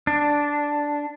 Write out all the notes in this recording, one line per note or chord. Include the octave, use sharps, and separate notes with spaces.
D4